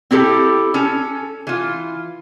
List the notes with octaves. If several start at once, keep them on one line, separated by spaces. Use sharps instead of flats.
C4 E4 G4 A4
C#4 A4
E3 F4